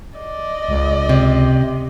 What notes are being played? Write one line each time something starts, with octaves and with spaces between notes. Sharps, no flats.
D5 D#5
C#2
C3